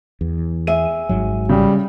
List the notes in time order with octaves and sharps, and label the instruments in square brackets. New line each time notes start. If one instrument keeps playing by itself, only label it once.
[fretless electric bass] E2
[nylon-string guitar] G#4 E5 [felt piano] D#7
[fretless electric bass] G#1 G#2 F#3
[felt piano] C#3 [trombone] G3